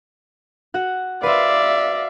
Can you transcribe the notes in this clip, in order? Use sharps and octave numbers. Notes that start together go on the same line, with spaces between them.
F#4 F#5
B4 C5 D5 E5 F5